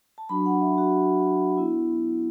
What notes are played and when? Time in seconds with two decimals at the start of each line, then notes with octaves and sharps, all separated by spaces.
0.18 A5
0.29 F#3 D4 F#4 B5
0.46 F#5
0.61 E5
0.78 F#4
1.58 B3 E4